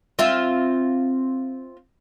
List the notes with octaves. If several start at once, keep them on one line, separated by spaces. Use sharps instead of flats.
C4 F4 E5